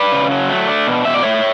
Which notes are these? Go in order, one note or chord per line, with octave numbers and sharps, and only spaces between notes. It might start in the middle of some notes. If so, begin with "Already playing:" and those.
Already playing: B4 D5
C#3
F#3
A3
D4
B2
B2 E5
D5
A3 C#5 E5